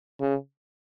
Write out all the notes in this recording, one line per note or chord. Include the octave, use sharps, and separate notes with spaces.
C#3